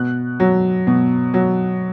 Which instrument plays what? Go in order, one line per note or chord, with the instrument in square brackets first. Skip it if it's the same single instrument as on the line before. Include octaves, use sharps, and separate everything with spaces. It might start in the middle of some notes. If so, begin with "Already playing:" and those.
Already playing: [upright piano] B2 F#6
F#3
B2
F#3